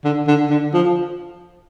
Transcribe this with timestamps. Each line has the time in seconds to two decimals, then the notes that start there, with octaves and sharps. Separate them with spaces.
0.05 D3
0.28 D3
0.50 D3
0.74 F3